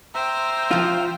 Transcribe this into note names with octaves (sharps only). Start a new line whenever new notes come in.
C5 E5 G5 A#5
F3 F4